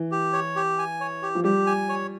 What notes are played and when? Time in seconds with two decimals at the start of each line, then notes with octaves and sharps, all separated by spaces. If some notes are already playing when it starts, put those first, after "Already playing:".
Already playing: E3
0.11 G4
0.33 C#5
0.56 G4
0.79 G#5
1.00 C#5
1.22 G4
1.35 F3
1.44 G3 G4
1.67 G#5
1.89 C#5